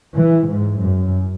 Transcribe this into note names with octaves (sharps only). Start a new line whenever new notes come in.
E3
G#2
F#2